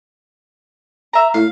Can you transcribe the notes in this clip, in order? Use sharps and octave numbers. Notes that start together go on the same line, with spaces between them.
E5 A#5
A2 F5